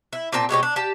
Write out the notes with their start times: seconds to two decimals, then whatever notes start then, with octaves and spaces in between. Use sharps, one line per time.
0.13 E4
0.32 A#2 C4 G5 A5
0.49 B2 G#3 G4 C#5
0.63 D4
0.76 G4 A5